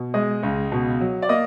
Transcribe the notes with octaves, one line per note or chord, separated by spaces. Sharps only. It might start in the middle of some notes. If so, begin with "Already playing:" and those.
Already playing: B2
G#3 D#5
C#2
B2
F#3
D5
A#3 D#5